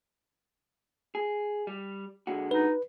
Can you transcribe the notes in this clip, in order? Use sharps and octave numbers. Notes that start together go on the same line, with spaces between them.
G#4
G3
D3 G#3 F#4
D#4 B4